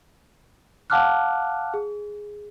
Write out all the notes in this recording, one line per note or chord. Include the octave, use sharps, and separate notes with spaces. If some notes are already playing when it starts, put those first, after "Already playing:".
F5 F#5 A5 D6 F6 F#6
G#4